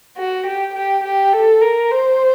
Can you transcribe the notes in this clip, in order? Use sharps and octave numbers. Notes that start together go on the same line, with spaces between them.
F#4
G4
G4
G4
A4
A#4
C5